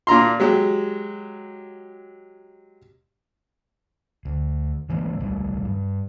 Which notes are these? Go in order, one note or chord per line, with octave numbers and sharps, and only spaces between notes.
A#2 D4 A#5 C6
F#3 G#3 G4
D2
A2 E3 G#3 A#3
D1 B1 A2 G3
G2